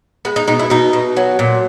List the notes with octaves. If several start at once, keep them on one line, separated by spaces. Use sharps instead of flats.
G#3 B3
D#4
B2 D#4
E4
B2 D#4
B2
F#3
A#2